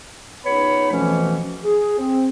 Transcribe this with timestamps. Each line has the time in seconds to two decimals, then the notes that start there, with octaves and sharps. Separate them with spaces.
0.46 C#2 B3 D#4 C#5 B5
0.92 F2 B2 E3 F3 A3 C#4
1.64 G#4
1.98 C4